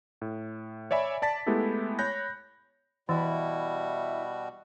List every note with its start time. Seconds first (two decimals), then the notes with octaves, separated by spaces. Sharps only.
0.21 A2
0.91 C#5 D5 E5 G#5 B5
1.22 D5 A5 A6 B6
1.47 G#3 A3 B3 E4 G4 A4
1.99 C#5 B5 F#6 G6 A#6
3.09 B2 E3 G3 E4 F#4